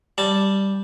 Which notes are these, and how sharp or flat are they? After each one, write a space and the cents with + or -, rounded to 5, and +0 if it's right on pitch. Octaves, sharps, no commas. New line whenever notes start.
G3 +0 A5 +0